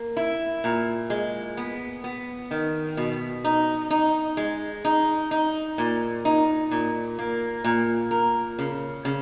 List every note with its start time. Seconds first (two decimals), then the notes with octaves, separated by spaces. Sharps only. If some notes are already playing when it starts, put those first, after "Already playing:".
Already playing: A#3
0.17 E4
0.64 A#2
1.10 G#3
1.57 B3
2.04 B3
2.51 D#3
2.97 B2
3.44 D#4
3.91 D#4
4.37 G#3
4.85 D#4
5.31 D#4
5.78 A#2
6.25 D#4
6.71 A#2
7.19 A#3
7.64 A#2
8.11 A#4
8.59 C#3
9.05 C#3